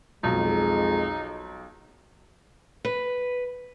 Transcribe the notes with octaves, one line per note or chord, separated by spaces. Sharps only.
B1 F2 G#3 D#4
B4